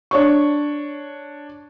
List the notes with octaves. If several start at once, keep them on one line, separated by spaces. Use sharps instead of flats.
D4 C#5 C#6